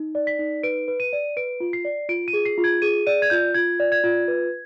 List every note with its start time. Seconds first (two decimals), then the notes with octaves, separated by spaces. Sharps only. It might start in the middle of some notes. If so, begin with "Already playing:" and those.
Already playing: D#4
0.15 D5
0.27 B6
0.39 D#4
0.63 B4 D7
0.88 B4
1.00 D#7
1.13 D5
1.37 B4 D7
1.60 F4
1.73 C7
1.85 D5
2.09 F4 D7
2.28 D#7
2.33 G#4
2.45 C7
2.58 F4
2.64 G#6
2.82 G#4 D#7
3.06 D5 D#7
3.22 G#6
3.30 F4 G6
3.54 F4 G#6
3.80 D5
3.92 G#6
4.04 F4
4.28 B4